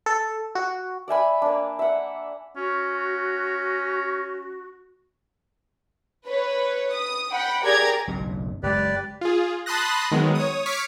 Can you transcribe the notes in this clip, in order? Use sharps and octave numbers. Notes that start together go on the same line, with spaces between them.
A4
F#4
D5 E5 G#5 B5
A#3 D4
E5 F#5
C#4 F#4
B4 C#5
D#6
F#5 G5 B5
G4 G#4 A#4 D5 A#5 G#6
F#1 B1 A#2
F#1 C3 G#3 G4 B4 D5
F4 G#4
A5 B5 C6 D#6 F#6 A#6
D#3 F#3 G#3 B3
C#5 D#6
C#6 D6 F6 G#6 B6 C#7